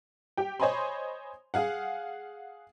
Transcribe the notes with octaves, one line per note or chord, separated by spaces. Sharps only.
G4 G5
C5 C#5 D#5 G#5 B5 C6
G#4 F5 F#5